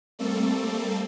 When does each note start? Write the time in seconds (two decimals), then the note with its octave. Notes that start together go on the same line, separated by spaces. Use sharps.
0.19 G3 A3 A#3 C4 A4